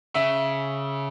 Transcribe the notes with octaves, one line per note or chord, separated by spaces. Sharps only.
C#3 E5